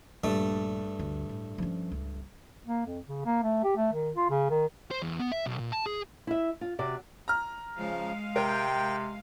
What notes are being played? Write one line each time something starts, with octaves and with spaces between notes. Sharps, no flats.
A#1 G2 A3
D2
A2
F3 C#4
C#2
A#3
F2
C#3
A#3
A3
G4
A3
D#3
F4
C#3
D#3
C5
E2
B3
E5
B1
A#2
A5
G#4
E4 E5
F4
C3 F#4 D5
A#5 F6
C#3 F3 G#3 F5
C3 A#4 G5